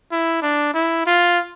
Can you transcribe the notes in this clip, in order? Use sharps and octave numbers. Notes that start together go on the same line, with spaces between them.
E4
D4
E4
F4